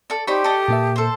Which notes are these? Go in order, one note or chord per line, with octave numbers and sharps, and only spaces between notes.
A4 D5
D#4 G4 C5 D5 B5 C#6
A4 D#5
A#2 A#3 E5
A4 C5